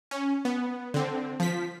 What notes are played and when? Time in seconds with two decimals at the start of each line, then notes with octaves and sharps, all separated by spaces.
0.11 C#4
0.45 B3
0.94 D3 C4
1.40 F3 B6